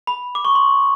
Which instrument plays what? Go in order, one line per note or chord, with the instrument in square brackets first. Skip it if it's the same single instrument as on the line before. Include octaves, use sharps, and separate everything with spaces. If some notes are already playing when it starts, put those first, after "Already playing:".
[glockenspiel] B5
D6
C#6
C6